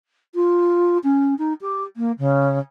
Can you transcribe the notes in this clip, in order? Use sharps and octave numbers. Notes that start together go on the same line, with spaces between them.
F4
C#4
D#4
G4
A#3
C#3